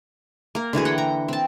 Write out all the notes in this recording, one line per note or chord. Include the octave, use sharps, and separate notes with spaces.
A#3 A#4
D3 E3 F#4 G#4
F#5 G5
A#5
C4 A5